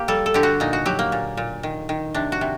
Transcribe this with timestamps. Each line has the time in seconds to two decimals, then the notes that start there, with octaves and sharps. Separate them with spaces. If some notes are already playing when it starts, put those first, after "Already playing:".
Already playing: A#3 G4
0.08 G3 A4
0.26 A4
0.34 D3 G4
0.43 F#4
0.60 A#2 D#4
0.73 F#4
0.86 F#3 G4
0.99 A#3
1.12 A#2
1.37 A#2
1.63 D#3
1.89 D#3
2.14 C3 D4
2.32 F#4
2.41 C3